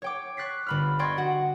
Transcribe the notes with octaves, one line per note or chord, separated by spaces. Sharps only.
C#5 G5 D6
C#6 F#6 A6 B6 C7
G1 B5 F6
D5 D#5 G5 C6 C#6 G#6
F#4 F#5